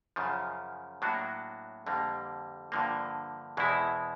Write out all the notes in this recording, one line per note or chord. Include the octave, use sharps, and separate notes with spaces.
F#2 C#3 F3
A2 F#3 A#3 D4 F#4
F2 D3 G3 A#3
G2 D3 F3 A#3
E2 B2 G#3 C4 E4